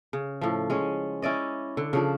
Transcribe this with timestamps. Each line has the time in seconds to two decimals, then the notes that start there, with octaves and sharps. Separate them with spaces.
0.13 C#3
0.41 A2 F3
0.70 G#3 C#4
1.22 C#4 E4 D5 D#5
1.77 D3
1.93 C#3 F3 D4